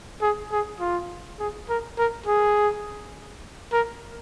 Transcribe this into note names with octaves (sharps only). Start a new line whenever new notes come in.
G#4
G#4
F4
G#4
A#4
A#4
G#4
A#4